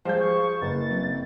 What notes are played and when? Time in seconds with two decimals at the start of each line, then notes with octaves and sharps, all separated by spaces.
0.05 F3 G3 G#3 G#4 C5 F5 A5 G6
0.20 C#6
0.62 F#1 B4 A6
0.91 F#3 C4